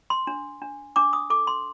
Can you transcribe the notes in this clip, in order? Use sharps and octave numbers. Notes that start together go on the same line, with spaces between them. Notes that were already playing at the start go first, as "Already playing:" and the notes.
C6
D4
D4
D4 D6
D#6
A4 D6
C6